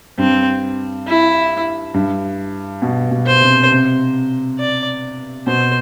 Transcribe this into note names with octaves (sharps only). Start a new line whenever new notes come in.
G2 C4
E4
G2
B2
B2
C5
C3
C3
D5
B2 C5